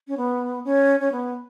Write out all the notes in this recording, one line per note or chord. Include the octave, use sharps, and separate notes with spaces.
C#4
B3
C#4
C#4
B3